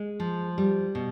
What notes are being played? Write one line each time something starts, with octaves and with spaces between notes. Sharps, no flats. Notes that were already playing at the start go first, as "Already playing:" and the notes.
Already playing: G#3
F3
G3
B2